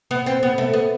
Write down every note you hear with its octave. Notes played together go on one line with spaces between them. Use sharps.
B3
C4
B3
A3
B3